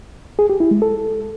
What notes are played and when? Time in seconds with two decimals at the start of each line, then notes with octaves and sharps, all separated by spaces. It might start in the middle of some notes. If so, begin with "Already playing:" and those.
0.39 G#4
0.50 G4
0.60 E4
0.71 G#3
0.82 A4